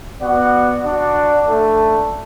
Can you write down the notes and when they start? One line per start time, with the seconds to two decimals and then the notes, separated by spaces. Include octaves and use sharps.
0.21 B3 F#4 D5 F#5
0.84 D4 F#4 D5
1.48 A3 D4 A4